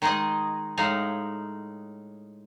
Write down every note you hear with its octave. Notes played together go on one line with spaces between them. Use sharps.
D#3 G#3 D#4 G#4 D#5
A2 G#3 D#4 F5